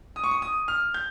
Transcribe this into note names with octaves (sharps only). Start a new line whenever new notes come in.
D#6
C#6
D#6
D#6
F6
G6